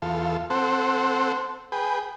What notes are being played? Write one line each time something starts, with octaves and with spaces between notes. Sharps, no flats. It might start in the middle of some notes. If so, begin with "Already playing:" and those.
E2 F4 A4
C4 A4 C5 F#5
G#4 B4 G5